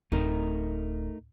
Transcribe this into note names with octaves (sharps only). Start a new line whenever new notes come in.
D1 A3 D#4 A#4